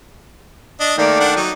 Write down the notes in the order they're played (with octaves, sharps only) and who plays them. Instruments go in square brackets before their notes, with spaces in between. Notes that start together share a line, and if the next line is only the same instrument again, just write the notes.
[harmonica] D4 D#5
[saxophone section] D#3 A3 D5 [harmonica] A#3
[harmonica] D4 F#5
F#3 D#4